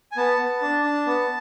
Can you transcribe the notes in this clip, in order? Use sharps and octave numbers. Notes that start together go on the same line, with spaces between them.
G#5
B3 A5
B3
D4
D4
B3